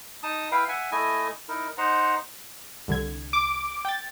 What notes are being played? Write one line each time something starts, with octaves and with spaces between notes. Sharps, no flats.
D#4 A5 D#6
E4 B4 F5 G5
E5 F#5 G#5
A3 E4 D#5 G#5
D#4 E4 A#4
D#4 C5 F#5 A#5
C2 D3 G#6
D6
G5 A6